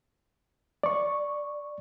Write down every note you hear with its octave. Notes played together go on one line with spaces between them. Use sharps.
D5 C#6